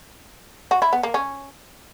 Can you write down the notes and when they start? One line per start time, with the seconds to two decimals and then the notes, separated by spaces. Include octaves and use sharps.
0.71 F#4
0.82 E4
0.93 B3
1.03 A#3
1.14 C#4